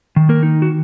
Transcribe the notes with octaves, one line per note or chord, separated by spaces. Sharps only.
D#3
A#3 A#4
D#4
F#4